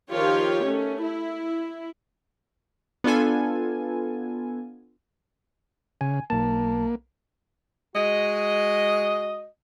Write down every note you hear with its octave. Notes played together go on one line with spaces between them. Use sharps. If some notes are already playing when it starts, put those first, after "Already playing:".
D#3 F3 F4 G4 C#5
A3 C#4
E4
B3 D4 F4 A4 G#5
C#3 G#5
B1 A#3 A5
G#3 F#4 D#5